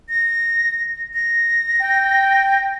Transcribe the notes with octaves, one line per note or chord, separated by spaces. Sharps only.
A#6
A#6
G5